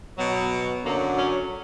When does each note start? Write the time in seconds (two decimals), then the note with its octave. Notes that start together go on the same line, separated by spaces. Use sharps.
0.17 B2 F#3
0.84 F#2 D3 F#3 A#3
1.17 C#4